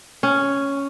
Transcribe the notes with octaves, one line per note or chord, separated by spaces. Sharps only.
C#4